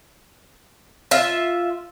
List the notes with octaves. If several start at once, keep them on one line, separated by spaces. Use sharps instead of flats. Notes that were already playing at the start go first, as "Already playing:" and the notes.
F4 E5